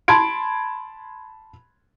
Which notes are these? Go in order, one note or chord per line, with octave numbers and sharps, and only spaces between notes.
A5 B5 C6 G#6 D7